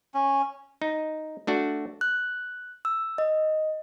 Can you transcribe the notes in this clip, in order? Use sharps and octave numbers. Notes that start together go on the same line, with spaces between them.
C#4
D#4
A3 D4 F#4
F#6
E6
D#5